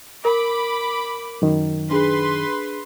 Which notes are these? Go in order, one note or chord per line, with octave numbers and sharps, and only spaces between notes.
A#4 B5 D6
F#2 D#3
D4 G#4 B4 C6